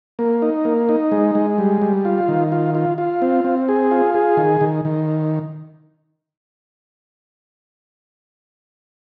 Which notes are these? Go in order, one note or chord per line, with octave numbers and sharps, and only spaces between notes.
A#3
D#4
A#3
D#4
G#3
G#3
G3
G3
F4
D#3
F4
F4
F4
C4
C4
G#4
F4
G#4
D#3
D#3
D#3